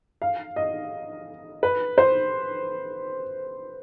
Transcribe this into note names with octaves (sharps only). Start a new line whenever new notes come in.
F5
D#5
B4
C5